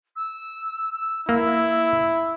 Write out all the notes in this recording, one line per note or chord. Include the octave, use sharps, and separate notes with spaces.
E6
E6
A#3 E4 E6